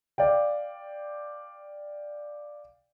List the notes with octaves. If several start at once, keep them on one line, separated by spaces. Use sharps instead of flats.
D5 F5 G5